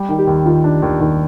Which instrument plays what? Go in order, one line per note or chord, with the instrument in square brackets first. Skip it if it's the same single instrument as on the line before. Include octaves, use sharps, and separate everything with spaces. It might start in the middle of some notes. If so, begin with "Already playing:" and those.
Already playing: [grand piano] G3
D#3
[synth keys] G4
[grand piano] D#2
[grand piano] D#3 [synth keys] F4
[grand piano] D4
D#2
[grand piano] D#2 [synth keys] D#4